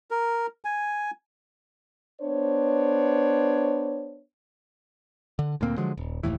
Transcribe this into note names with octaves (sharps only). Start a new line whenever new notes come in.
A#4
G#5
B3 D4 C5 C#5
D3
D2 A#2 A#3 C4
D3 F3 F#3 G#3
D#1
F1 D#2 A2 E3